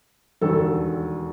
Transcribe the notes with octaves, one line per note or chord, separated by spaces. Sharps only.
E1 D#2 D3 A4